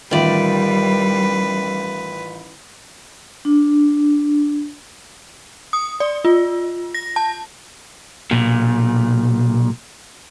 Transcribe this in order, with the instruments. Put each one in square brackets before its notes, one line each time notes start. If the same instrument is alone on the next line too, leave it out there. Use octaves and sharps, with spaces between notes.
[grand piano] A1 F4 E5 [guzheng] D#3 D5 [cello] G3 [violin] B4
[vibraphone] D4
[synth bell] D#6
D5
F4
A#6
A5
[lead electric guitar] B1 A#2